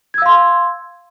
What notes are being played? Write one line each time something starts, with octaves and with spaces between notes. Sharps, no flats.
F5 C6 E6 G#6